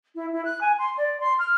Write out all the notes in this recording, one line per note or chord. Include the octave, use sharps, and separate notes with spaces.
E4
E4
F#6
G#5
C6
D5
C6
F6